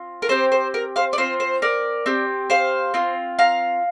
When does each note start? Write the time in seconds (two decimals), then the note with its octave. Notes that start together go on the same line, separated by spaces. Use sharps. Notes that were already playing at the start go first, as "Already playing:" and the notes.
Already playing: C4 F4
0.22 A#4
0.29 C4 G4 C5
0.52 C5
0.74 A#4
0.96 C5 F5
1.13 D5
1.18 C4 F4 C5
1.40 C5
1.62 A#4 D5
2.06 C4 G4
2.50 C5 F5
2.94 C4 F4
3.39 F5 A#5